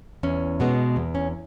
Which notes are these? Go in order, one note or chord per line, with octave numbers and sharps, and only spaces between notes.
E2 C#4
B2 G#3 B3
E2
C#4